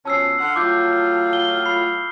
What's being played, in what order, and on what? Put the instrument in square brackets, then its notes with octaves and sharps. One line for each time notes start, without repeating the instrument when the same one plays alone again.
[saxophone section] B2 F3 C#4 [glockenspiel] A5 E6 C7
[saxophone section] D3 F5 F#5
[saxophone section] A2 F#3 F4 [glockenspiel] D6 E6 G6
[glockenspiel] F6 G7
B5 C7